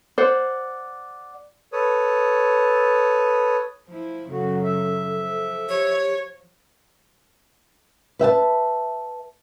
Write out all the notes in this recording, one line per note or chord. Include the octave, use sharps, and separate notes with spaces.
C5 D5 F#5
A4 B4 C#5 D#6
F3 E4
F#2 C#3 F#4 A4
E5
F3
G4 C#5
B4 E5 F#5 A5